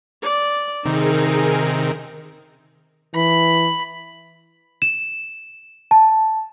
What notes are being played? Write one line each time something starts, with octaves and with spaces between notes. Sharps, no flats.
D5
C3 D#3 D#4 G#4 A#4
E3 B5
E7
A5